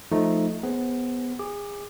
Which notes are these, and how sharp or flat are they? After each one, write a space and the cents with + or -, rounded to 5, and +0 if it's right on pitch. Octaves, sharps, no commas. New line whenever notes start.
F3 +0 A3 +0 D#4 +0
B3 +5 G#4 +0 C5 +20
G#4 -30 D6 +5